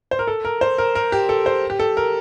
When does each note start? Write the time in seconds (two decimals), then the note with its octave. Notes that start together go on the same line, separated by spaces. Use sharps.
0.11 C5
0.19 A#4
0.27 A4
0.45 A#4
0.61 C5
0.78 A#4
0.95 A#4
1.12 G4
1.29 A4
1.46 C5
1.70 G4
1.79 A4
1.97 A#4